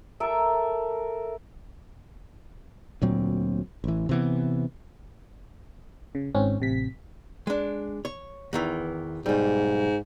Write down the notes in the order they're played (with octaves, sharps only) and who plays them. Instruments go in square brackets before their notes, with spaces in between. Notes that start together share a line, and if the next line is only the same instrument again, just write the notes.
[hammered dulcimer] A4 A#4 E5
[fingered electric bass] D2 A#2 F#3 C4
A1 E3
C3 E3 B3
[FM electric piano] C#3
G#1 G#2 C4 C#4
A1 C3 B6
[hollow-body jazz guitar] G#3 D4
C#5
E2 D#3 E3
[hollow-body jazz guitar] B1 G3 [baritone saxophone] G#2